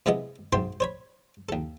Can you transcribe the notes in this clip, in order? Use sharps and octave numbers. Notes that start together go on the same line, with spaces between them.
C3 G#3 B3 E4 D#5
B1 G#2 C5 G5 C6
C5 C#5 B5
D#2 A4